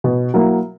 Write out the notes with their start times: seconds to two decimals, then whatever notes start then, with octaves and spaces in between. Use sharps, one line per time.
0.04 B2
0.34 F#3 A#3 E4